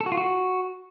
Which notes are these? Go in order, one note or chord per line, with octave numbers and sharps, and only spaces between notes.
A4
F#4
F4
F#4